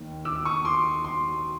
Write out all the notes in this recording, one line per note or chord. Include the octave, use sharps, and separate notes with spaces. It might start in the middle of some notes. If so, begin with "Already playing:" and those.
Already playing: D#2 D#3
D6 E6
C#6 D#6
C6 D6
C6